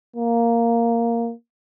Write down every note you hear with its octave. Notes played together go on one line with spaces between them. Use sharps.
A#3